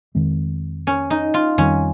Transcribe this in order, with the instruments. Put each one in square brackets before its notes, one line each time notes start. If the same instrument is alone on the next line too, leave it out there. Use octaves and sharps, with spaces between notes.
[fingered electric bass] F2 D#3 G#3 C4
[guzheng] C#4
D#4
F4
[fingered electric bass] F2 D#3 G3 C4 [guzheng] C#4